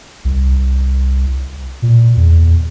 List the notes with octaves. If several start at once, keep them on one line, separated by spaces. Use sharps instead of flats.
C2
A#2
E2